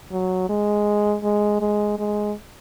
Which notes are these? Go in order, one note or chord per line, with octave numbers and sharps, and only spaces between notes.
F#3
G#3
G#3
G#3
G#3